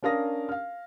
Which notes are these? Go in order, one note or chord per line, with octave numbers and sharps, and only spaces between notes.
C#4 D4 A#4 F5 D#6 A#6
F5 F6